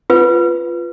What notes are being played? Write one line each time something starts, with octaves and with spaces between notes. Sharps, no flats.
F4 B4